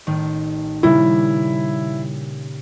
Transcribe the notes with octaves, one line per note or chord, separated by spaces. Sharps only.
A1 D#3
A#2 C#3 G3 E4